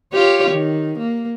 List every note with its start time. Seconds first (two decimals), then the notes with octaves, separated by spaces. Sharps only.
0.13 F4 G4 C#5
0.51 D#3
0.99 A#3